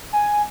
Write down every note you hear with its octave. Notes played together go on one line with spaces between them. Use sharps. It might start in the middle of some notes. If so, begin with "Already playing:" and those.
G#5